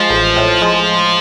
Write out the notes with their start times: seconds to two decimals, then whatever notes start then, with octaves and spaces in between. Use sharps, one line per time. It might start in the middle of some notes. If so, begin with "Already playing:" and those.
Already playing: F3 G#3
0.10 A1
0.36 A2
0.62 G#3